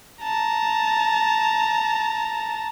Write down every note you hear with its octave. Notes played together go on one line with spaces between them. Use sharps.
A5 A#5